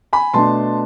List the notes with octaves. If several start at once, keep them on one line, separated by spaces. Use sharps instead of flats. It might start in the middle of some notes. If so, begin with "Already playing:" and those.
G#5 B5
B2 A3 D4 A5 C6